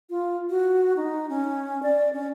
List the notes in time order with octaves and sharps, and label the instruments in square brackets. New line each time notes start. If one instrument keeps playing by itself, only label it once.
[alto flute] F4
F#4
D#4
C#4
D5
C#4